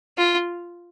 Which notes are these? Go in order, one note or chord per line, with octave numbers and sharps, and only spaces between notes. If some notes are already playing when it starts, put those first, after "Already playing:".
F4